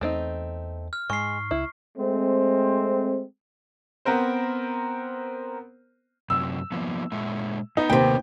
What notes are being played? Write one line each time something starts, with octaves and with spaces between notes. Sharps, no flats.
E2 E3 A3 C4 D#4
F6
G#2 G#3 C#6 C7
C#2 E4
G#3 A3 C4
B3 C4 A#4 C5
F#2 C3 E6
F3 A#3 B3
A#2 G#3 E5
A2 B3 D#4 B4
D#2 C3 G5